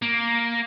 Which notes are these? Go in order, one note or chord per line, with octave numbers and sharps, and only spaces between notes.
A#3